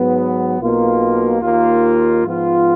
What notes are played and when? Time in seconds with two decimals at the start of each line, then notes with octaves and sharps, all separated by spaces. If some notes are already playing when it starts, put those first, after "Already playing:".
Already playing: G#2 F#3 B3
0.59 B1 B2 A#3 F4
1.42 D#2 D#3 A#3 F4
2.24 G#2 F3 B3 F4